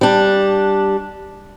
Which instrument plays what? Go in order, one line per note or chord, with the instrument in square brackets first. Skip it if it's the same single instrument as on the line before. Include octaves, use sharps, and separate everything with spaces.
[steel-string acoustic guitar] G3 D4